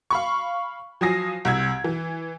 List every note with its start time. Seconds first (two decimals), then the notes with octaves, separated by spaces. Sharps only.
0.10 F5 B5 C#6
1.01 F3 F#3 G#5 D#6 A#6 C7
1.45 C2 E6 G#6
1.84 E3